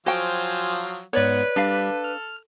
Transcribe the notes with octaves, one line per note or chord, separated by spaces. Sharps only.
F3 F#3 F#4 C5 F5 G5 G#5
G#2 B3 B4 C#5 D5
G3 D4 A4 F5
F6